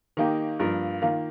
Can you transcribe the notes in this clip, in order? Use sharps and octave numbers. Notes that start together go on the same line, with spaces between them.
D#3 A#3 D#4 G4
G2 F3 A#3 F4 A#4
D#3 A#3 F4